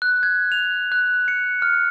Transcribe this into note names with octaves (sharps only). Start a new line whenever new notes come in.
F#6
G#6
F7
F#6
C#7
F6